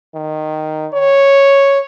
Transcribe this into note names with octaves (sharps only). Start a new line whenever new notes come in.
D#3
C#5